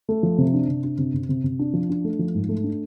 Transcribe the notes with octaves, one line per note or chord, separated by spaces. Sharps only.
A3
F3
C3
D4
C3
D4
C3
C3
C3
C3
D4
F3
D4
A3
F3
G#2
A3
D4